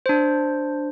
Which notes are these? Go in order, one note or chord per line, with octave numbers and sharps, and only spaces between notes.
D4 C5